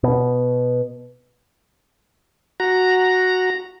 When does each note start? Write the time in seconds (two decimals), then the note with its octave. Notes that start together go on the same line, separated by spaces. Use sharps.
0.03 B2
2.60 F#4 A#5